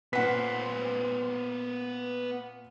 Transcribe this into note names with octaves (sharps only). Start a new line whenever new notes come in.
A#2 B3 B4 C5 F#5 B6